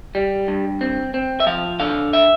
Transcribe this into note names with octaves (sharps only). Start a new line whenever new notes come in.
G3
G2
C4
C4
E5
F3 F5
D3 F5
E5